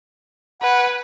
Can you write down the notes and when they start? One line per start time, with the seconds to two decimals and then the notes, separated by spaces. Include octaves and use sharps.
0.62 B4 F#5 G#5